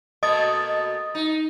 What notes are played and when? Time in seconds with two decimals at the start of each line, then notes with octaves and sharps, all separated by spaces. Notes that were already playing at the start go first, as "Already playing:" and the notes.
0.23 B2 A3 A#3 D#5 D#6 A6
1.15 D#4